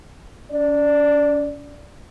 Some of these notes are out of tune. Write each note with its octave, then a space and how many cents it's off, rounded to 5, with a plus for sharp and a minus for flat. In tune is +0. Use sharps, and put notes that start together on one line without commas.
C#4 +45 D5 +0